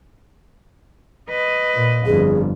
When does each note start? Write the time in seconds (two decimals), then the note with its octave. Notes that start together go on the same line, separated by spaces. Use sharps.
1.30 B4 D#5
1.75 A#2
2.06 G1 F2 G#4